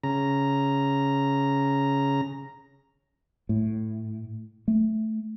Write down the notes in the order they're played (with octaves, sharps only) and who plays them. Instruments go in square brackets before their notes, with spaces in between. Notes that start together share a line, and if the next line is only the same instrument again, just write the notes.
[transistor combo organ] C#3 A#5
[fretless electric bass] A2
A3